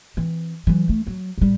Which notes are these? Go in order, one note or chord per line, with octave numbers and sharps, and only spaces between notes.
E3 C4
E3 F#3
A3
F#3
A1 G3